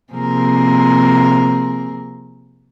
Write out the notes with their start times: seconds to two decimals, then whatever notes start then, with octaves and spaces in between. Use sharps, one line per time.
0.13 C3 F3 A#3 C4 G#4 A#4